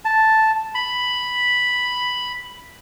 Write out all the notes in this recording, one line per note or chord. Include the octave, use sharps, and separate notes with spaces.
A5
B5